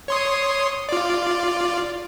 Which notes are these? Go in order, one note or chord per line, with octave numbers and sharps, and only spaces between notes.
C#5 C6 D#6
F4 D5